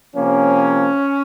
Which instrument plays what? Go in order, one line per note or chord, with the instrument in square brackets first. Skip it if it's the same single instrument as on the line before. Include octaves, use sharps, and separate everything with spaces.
[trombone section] C3 F3 A#3 C#4